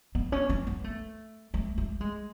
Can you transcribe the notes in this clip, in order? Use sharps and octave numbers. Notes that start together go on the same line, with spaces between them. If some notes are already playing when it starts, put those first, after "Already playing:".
B3
C#4
C#4
B3
A3
A3
A3
G#3